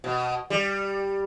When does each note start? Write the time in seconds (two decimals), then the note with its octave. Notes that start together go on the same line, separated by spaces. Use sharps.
0.04 B2
0.50 G3